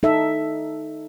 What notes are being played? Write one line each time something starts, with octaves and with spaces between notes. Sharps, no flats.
D#4 A4 E5